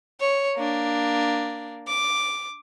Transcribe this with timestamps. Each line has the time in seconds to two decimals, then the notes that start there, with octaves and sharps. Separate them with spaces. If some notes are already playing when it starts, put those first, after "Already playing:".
0.20 C#5
0.56 A#3 D4
1.88 D6